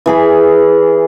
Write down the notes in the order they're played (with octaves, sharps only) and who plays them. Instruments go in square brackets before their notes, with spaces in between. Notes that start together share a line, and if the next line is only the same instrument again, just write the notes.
[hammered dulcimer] E3 G#4 B5